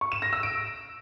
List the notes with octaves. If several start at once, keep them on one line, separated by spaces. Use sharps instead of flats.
C#6
E7
A#6
E6
D7